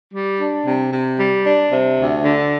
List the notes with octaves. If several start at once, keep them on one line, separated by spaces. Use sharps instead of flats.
G3
D4
C3
C3
G3
D4
C3
D2
D3